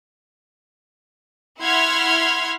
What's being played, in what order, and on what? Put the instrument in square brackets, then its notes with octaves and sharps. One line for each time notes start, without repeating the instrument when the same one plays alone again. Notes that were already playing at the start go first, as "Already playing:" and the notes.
[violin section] E4 F#5 C6 F6 G#6 B6